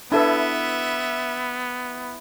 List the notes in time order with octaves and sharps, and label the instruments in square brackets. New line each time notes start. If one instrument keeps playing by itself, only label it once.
[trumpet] B3 [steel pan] D4 A4 B4 [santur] E4 [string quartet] E5